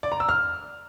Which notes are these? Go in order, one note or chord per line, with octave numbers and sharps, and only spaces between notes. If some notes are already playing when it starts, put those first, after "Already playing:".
D5
A#5
E6
F6